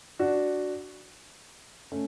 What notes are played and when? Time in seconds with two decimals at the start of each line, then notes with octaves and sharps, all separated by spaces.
0.19 D4 F#4
1.92 A3 C#4